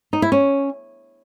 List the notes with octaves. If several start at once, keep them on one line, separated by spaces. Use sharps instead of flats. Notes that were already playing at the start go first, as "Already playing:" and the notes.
D#4
E4
C#4